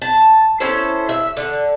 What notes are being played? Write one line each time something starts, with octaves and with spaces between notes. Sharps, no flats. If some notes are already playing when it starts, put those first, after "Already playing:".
A5
C#4 E4 A4 C5
E5
D3